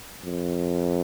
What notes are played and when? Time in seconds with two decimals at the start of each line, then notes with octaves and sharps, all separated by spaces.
0.24 F2